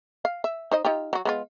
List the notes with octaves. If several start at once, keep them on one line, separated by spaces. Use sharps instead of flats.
F5
E5
D#4 C5 D#5
D#4 F4 G4
F#3 F#4
G#3 B3 F4